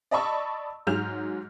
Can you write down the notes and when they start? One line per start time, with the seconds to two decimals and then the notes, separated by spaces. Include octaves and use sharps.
0.11 D5 D#5 A5 B5 C#6 E6
0.87 G#2 F#3 G#4 F6 G6 F7